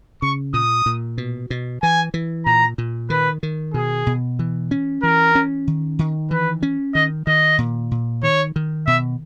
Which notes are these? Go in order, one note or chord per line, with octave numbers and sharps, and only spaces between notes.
C#3 C#6
A#2 D#6
A#2
B2
B2
E3 G#5
E3
A#2 A#5
A#2
D#3 B4
D#3
B2 G#4
B2
E3
C#4
E3 A#4
C#4
D#3
D#3
E3 B4
C#4
D#3 D#5
D#3 D#5
A#2
A#2
D#3 C#5
D#3
B2 E5